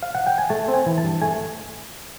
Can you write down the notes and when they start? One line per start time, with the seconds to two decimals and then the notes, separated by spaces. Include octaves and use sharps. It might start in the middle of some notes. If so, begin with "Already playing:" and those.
0.03 F5
0.15 F#5
0.27 G5
0.38 G#5
0.50 A3 A5
0.68 C4
0.74 G#5
0.86 E3
0.98 A5
1.04 G2
1.22 A3 G#5